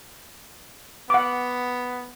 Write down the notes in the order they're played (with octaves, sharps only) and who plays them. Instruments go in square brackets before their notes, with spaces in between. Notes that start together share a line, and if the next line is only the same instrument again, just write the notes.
[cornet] B3 [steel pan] F#5 D6